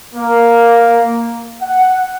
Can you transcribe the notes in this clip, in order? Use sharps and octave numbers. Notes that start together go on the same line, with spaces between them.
A#3
F#5